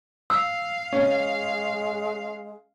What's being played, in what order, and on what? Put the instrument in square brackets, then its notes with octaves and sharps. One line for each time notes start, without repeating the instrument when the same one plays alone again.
[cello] F5 [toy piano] E6
[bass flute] G#3 [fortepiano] C#4